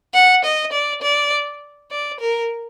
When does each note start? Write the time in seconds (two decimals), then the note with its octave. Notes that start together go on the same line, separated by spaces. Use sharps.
0.14 F#5
0.45 D#5
0.73 D5
1.02 D5
1.91 D5
2.20 A#4